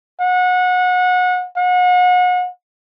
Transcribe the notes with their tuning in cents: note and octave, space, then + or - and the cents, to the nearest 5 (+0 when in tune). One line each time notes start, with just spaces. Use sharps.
F#5 -25
F#5 -35